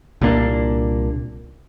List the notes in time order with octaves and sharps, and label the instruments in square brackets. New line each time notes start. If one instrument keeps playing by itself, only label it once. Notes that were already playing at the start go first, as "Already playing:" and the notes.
[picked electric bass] C2 A#2 A#3 D4